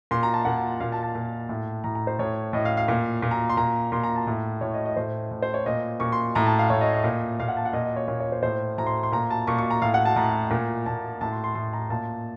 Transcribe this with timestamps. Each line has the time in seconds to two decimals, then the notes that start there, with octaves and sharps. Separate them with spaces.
0.11 A#2 C6
0.23 A#5
0.34 A5
0.45 A#2 F#5
0.80 A#2 F5
0.92 A5
1.03 A5
1.15 A#2
1.49 A2
1.84 A2 A#5
1.95 A#5
2.07 C5
2.19 A2 C#5
2.53 A2 D#5
2.65 F5
2.77 F5
2.88 A#2
3.23 A#2
3.31 A#5
3.49 C6
3.57 A#2 A#5
3.92 A#2 C6
4.03 A#5
4.16 A5
4.27 A2
4.61 A2 C#5
4.74 D#5
4.85 D#5
4.96 A2 C5
5.31 A2
5.42 C5
5.54 C#5
5.66 A#2 D#5
6.00 A#2 C#6
6.12 C6
6.35 A2 A#5
6.46 A5
6.59 F5
6.70 A2 C#5
6.81 D#5
6.93 D#5
7.04 A#2
7.40 A#2 F5
7.48 F#5
7.57 A5
7.65 F#5
7.73 A#2 D#5
7.85 D#5
7.96 C#5
8.08 A#2 C#5
8.20 C#5
8.32 C5
8.43 A2 C5
8.78 A2 A#5
8.87 C6
9.03 C6
9.12 A#2 A#5
9.31 A5
9.47 A#2 C#6
9.58 C#6
9.70 A#5
9.82 A2 F5
9.94 F#5
10.05 A5
10.16 A2 A#5
10.51 A#2
10.86 A#2 A5
11.21 A2 A5
11.32 C6
11.44 C6
11.55 A2 C6
11.73 A#5
11.90 A#2 A5